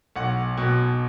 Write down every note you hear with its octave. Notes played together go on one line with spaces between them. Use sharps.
B1 F#5
B2